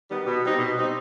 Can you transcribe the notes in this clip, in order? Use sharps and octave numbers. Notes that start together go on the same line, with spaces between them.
D#3 G3 B3
B2
G3 C4 D#4
B2
G3 C4 D#4